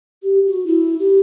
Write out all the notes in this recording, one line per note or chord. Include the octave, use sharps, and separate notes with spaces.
G4
F#4
E4
G4